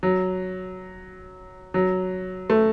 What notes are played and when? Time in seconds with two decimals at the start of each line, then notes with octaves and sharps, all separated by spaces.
0.03 F#3
1.74 F#3
2.50 A3